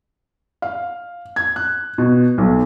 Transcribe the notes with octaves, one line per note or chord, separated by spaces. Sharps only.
F5
G#6
F#6
B2
B1